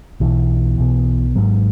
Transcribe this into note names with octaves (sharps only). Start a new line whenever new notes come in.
B1 B2 E3
B1 B2
G#1 G#2 F#3 A#3